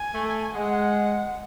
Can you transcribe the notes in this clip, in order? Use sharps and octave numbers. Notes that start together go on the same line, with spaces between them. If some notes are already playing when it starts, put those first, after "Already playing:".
Already playing: G#5
A3
G#3 F#5